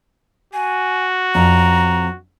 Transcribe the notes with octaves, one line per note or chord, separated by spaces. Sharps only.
F#4 G#5
F2 C#4 A#5